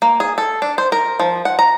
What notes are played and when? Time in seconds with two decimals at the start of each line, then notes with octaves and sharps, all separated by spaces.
0.02 A#3
0.20 G#4
0.38 A4
0.62 D4
0.78 C5
0.92 A#4
1.19 F3
1.45 F#5
1.59 A#5